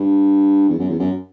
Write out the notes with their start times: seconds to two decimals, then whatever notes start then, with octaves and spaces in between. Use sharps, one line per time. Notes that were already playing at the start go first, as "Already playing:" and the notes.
Already playing: G2
0.69 E2
0.79 F#2
0.89 E2
0.99 F#2